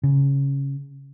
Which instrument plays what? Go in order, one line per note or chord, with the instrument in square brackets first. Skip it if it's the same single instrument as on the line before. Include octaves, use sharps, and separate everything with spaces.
[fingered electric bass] C#3